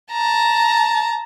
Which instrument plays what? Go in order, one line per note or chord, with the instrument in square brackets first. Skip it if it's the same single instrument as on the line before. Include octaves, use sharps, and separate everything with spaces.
[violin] A5 A#5